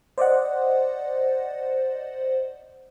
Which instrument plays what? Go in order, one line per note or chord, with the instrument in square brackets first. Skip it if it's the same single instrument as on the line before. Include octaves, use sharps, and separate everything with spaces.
[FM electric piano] C5 D5 D#5 F#5